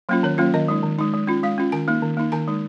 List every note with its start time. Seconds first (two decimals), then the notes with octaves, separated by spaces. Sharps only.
0.09 F#3 A#3 C#4 F4
0.23 D#3 C#5
0.38 F#3 A#3 C#4 F4
0.54 D#3 D#5
0.68 G#3 D#4
0.83 D#3
0.99 G#3 D#4
1.14 G#3
1.27 C#4 F4
1.43 G#3 F5
1.58 C#4 F4
1.72 D#3 G#5
1.88 A#3 D#4
2.02 D#3
2.17 A#3 D#4
2.32 D#3 G#5
2.48 G#3 D#4